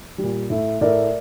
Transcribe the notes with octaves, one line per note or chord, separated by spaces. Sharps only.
G3
A#2
A2 A3
A2 A3 A#4 D5